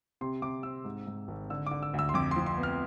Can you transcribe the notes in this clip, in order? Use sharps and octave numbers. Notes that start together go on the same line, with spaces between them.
C3 C6
C3 D6
C4 E6
G#2
G#2
G#1
D3 E6
D3 D6
E6
D2
E6
C6
F2 D6
F3 C6
C6
B3
F6